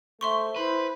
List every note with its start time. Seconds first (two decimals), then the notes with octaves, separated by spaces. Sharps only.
0.21 A3 C5 E5 C6 C#6
0.56 E4 B4 C5